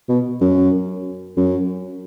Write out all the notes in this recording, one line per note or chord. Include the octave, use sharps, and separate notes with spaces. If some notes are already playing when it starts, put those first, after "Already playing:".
B2
F#2
F#2